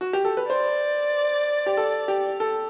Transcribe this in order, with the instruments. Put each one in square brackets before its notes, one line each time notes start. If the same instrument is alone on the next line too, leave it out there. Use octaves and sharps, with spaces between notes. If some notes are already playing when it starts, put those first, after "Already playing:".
[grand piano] F#4
G4
A4
B4
[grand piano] C5 [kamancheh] D5
[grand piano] G4
A4
G4
A4